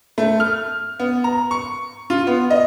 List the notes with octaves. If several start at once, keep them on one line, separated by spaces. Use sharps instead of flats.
A3
F6
B3
A#5
C#6
F4
B3
D#5